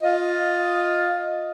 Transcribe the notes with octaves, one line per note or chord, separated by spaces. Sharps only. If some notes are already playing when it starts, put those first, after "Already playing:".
F4 D#5